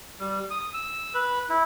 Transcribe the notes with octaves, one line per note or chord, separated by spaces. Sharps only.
G3
D#6
E6
B4
E4